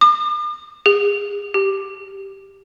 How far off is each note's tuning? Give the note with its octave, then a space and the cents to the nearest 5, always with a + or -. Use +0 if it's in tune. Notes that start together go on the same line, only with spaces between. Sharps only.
D6 +45
G#4 -35
G4 -5